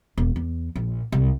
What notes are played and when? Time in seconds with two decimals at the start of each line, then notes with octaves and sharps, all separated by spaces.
0.18 E1
0.36 E2
0.76 A#1
1.12 C2